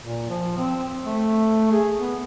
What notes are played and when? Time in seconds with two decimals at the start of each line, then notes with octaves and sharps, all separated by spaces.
0.02 A#2
0.30 F3
0.57 C4
1.04 A3
1.72 G#4
1.98 B3